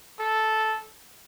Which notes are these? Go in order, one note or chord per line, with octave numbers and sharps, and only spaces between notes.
A4